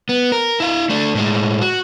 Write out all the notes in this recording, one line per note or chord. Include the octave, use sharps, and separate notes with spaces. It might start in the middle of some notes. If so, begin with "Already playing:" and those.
B3
A#4
E4 F5
A3 D4
A2 G#3
F#4